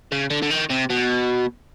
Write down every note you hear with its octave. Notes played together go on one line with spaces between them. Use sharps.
C#3
D3
D3
D#3
C3
B2